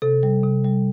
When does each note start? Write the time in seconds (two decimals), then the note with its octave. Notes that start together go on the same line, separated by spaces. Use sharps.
0.02 C3 A4
0.23 G3
0.44 C3
0.65 G3